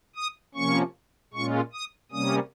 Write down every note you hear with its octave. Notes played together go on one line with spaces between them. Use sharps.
D#6
C3 F3 A#3 C#4 C#6
A#2 G#3 C#4 F4 C#6
D#6
C3 G3 A#3 C#4 D#6